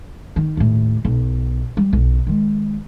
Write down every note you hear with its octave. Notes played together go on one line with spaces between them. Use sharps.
D#3
D#2 A2
B1
G3
B1
D#3 G#3